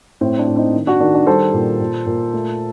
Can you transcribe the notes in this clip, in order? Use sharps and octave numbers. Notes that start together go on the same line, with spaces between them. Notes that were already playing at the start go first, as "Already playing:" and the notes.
A2 C4
D4
A2
C4 D#4
D#3
D4 F#4
D#3 D4
D4
G3 A4 C5
A#2
A#2
A#2
A3